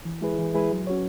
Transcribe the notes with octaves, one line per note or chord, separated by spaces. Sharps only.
E3
G#3 E4 G#4 B4
E3
G#3 E4 G#4 B4
F#3
C#4 F#4 C#5